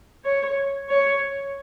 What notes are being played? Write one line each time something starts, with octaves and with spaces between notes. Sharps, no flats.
C#5
C#5